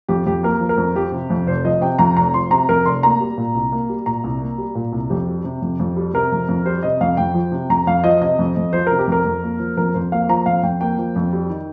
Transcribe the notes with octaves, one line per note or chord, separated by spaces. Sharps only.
F2 G4
F2 G4
A#3 A#4
F3
A#4
F2
F3 G4
C3
F2
F1 C5
F3 D#5
C3 G5
F2 A#5
F1 A#5
F3 C6
C3 A#5
F2 A#4
F1 C6
A#3 A#5
G3
A#2
C2
A#3
G3
A#2 A#5
C2
A#3
G3
A#2
C2
F2 G4
G3
C3
F2
F2
G3
C3 A#4
F2
F2
G3 C5
C3 D#5
F2 F5
F2 G5
F3
C3
F2 A#5
F2 F5
F3 D#5
C3 D#5
F2
F2
F3 C5
C3 A#4
G4
F2 A#4
F2
A#3
F3
F2 A#4
F2 C5
A#3 F5
F3 A#5
F2 F5
F2 G5
A#3 G5
F3
F2
G3
D#3